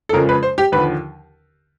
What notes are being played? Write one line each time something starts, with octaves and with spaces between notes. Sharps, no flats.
A4
F2 C#3 F3 G#3 A#4
B4
C5
G4
D#2 D3 F3 B4